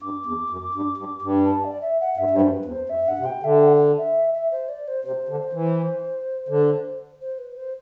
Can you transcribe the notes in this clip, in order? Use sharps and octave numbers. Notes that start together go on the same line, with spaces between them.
G2 D6
E2
F#2
G2
G2
G2
A5
D5
E5
F#5
G2 E5
G2
C5
F#2
B4
E2
C5
F#2 E5
G2 F#5
C3
B2 G5
D3 E5
G5
F#5
E5
E5
C5
D5
C5
C3 C5
D3
E3
D3
C5
B4
C5